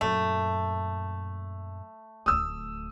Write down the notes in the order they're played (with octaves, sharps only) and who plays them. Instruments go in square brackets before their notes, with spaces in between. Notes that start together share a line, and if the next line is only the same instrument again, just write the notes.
[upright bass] F#2 A#2 [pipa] A3
[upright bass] D1 D2 [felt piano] D#6 E6